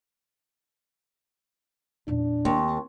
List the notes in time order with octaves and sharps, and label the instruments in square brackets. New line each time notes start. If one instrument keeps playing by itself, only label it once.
[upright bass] E2 A#2 [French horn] D4
[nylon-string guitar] D#2 [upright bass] C4 [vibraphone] C6 C#6